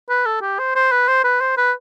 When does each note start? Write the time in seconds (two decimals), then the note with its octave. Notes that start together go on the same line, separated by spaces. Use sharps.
0.09 B4
0.26 A4
0.41 G4
0.59 C5
0.75 C5
0.91 B4
1.08 C5
1.24 B4
1.40 C5
1.58 B4